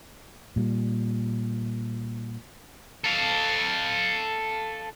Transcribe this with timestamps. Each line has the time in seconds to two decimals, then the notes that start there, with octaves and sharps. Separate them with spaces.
0.56 A#2 G3
3.04 A4 F5